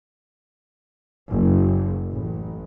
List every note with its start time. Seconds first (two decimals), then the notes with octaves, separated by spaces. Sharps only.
1.31 F#1
2.12 A1